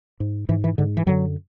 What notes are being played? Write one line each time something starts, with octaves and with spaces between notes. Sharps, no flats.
G#2
G#2 E3
E3
G#2 D3
E3
F#2 D3 F#3